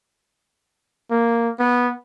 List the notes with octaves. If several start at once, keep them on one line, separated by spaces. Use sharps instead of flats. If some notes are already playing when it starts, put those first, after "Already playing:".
A#3
B3